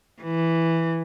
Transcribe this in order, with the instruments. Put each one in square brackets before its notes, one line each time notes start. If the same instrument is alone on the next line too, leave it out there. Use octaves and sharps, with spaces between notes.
[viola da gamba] E3